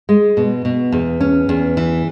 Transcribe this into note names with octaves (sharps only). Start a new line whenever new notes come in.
G#3
B2
B2
E2
C#4
E2
E3